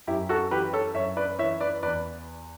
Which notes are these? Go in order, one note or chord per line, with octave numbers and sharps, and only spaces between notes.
F#2 E4 G4
F#4 A4
E3 G4 B4
A4 C#5
F#2 C#5 E5
B4 D5
E3 C#5 E5
B4 D5
E2 B4 D5